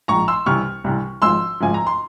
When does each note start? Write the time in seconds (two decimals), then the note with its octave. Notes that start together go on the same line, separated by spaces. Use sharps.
0.08 A#1 G#2 F3 A#5 C#6
0.28 C6 E6
0.46 C2 C3 E3 C#6 F6
0.84 C2 C3 E3
1.22 G#1 G#2 F3 C6 E6
1.60 G#1 G#2 F3 G#5
1.74 A#5
1.87 C6